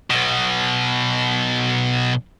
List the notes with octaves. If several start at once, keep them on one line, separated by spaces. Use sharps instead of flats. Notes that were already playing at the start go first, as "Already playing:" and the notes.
B1 B2